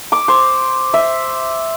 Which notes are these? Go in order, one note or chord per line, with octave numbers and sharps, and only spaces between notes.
D6
C5
E5